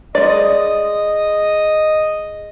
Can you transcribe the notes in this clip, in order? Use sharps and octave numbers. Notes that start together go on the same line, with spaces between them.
G#3 D5 D#5